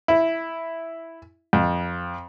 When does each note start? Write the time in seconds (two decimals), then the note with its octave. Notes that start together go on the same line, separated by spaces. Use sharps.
0.08 E4
1.53 F2